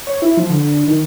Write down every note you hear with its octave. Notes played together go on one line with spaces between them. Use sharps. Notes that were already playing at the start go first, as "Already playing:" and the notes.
C#5
E4
F3
D3
D#3